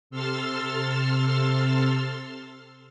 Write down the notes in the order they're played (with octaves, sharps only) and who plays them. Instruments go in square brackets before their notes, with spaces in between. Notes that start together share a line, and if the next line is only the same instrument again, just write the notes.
[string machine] C3 A4 C6 E6 F6 A6